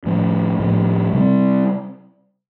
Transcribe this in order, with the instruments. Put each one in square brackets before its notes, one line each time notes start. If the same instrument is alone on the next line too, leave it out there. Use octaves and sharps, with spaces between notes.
[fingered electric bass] A2 F3 A3
A2 F3 A3
C3 G3 C4